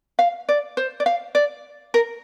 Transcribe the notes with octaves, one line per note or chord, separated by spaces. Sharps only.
F5
D5
C5
D5
F5
D5
A#4